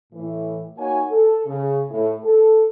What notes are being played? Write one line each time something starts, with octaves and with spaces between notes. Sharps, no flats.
A2 E3
A#3 D#4 F#4 C#5 F#5 G#5
A4
C#3
A2
A4